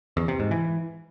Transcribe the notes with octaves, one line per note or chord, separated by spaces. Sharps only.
E2
C3
G#2
E3